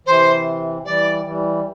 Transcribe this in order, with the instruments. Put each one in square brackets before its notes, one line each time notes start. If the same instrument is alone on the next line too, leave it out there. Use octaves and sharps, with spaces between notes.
[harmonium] C3 E3 [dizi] C5
[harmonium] E3 G3 [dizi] D5
[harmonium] E3 G3